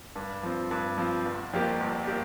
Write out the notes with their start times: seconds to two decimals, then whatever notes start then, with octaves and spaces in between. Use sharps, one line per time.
0.16 G2
0.43 F3 C4
0.71 G2
0.98 F3 C4
1.25 G1
1.53 F2 F3 A#3 G4
1.80 G1
2.07 A#3 G4